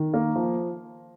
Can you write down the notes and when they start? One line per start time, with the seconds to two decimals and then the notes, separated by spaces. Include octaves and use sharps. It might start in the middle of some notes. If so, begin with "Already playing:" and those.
Already playing: D#3
0.14 A#3
0.35 F3